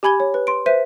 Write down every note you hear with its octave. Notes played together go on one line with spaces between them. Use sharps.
G4 G#5 B5 G#6 G7
C#5
B4
C6 D7
B4 C5 E5 B6 D#7